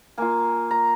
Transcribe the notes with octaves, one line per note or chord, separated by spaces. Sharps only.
A#3 F4 G#5
A#5